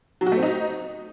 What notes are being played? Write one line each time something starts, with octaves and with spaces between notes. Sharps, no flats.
F#3
F#4
A3
C4
D#4